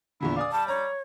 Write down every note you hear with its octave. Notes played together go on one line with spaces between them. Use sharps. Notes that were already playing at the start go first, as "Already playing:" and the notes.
E2 A#2 D3 E4
D5 F5 G#5 D#6
G3 A5
C#5 A#5